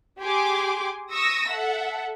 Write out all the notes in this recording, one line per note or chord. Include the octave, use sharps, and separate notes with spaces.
G4 G#4 G#5 C6 D6
C#6 D#6 E6 A#6
A4 E5 F#5